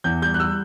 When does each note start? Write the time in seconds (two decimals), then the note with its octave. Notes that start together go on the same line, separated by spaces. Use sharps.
0.04 E2 G6
0.22 G3 G6
0.34 F#6
0.40 G3 E6